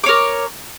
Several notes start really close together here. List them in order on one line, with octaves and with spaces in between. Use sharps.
D6 C#5 A#4